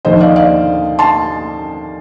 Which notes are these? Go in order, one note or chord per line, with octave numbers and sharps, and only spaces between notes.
D#2 D3 F3 C5 D#5
D5 F5
D5 F5
A5 C6